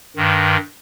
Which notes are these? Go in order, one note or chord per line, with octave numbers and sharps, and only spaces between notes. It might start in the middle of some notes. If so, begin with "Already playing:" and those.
G2 D#3